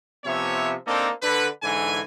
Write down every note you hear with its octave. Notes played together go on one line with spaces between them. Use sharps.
C3 F3 B3 C#5 E5
A#3 C4 D4 D#4 A4
D3 B4
G#2 D3 E3 G#5